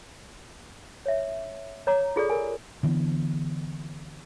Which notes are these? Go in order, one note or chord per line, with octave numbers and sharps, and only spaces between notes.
C#5 E5
C#5 A#5 D6
F4 G#4 A4 D5
A#4 G#5
D3 E3 B3